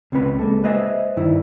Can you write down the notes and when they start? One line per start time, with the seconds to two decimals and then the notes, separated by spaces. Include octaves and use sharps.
0.12 C#2 C4 C#4 B4 B5
0.39 G#3 A#3 A4
0.64 B4 C5 D#5 E5 G#5
1.17 G2 D#3 E4